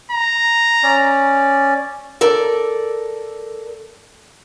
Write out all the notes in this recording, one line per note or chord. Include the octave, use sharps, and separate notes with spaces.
A#5
C#4 D5
A4 A#4 D5